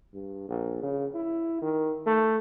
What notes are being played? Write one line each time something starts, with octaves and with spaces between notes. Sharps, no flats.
G2
A#1
C#3
E4
D#3
A3